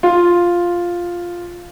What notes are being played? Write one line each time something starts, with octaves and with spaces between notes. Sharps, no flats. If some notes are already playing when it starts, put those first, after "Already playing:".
F4